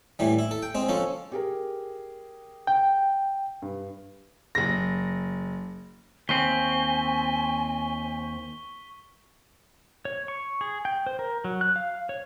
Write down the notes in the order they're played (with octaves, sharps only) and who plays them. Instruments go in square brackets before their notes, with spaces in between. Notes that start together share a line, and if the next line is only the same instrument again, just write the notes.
[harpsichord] A2 E3 G3
E4
A4
G5
G#3 C4
F3 C#4 A4
[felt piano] G4 G#4 A#4
[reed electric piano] G5
[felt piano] G2
[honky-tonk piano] F#1 A#6
[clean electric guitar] D#2 C4 [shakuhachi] G#5 [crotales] C#6 B6 G7
[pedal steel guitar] C#5
C#6
G#4
G5
C5
A#4
F#3
F#6
F5
C#5